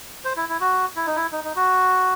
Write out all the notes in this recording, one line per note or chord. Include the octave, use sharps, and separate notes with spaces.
C5
E4
E4
F#4
E4
D#4
E4
D#4
D#4
F#4